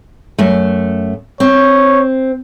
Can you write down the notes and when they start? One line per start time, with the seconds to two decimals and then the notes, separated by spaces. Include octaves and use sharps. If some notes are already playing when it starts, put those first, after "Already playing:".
0.38 F#2 A3
1.40 C4 C#5